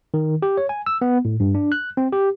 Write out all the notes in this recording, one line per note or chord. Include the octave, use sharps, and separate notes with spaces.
D#3
G4
C#5
G#5
E6
B3
A2
G2
D4
F#6
C4
G4